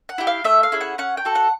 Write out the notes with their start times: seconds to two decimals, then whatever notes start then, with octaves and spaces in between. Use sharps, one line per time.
0.09 F#5
0.18 E4 G4
0.27 F5
0.44 A3 E5
0.63 F5
0.72 C#4 E4 G#4
0.81 F#5
0.98 C#4 F#5
1.17 G5
1.25 F#4 A4
1.35 F#5